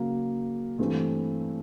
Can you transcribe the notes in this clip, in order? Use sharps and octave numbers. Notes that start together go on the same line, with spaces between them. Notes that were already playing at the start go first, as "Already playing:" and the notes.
Already playing: C#3 F#3 A#3
G2 E3 A3 C4